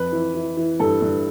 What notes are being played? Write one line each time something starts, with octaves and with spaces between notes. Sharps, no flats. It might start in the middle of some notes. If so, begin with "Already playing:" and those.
Already playing: F2 B4
E3
E3
E3
G2 A4
G2